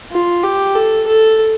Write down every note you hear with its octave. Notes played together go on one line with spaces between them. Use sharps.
F4
G4
A4
A4